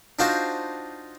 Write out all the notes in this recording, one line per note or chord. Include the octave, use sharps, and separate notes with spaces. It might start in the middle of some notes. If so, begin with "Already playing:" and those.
D4 D#4 F4 F#4 C5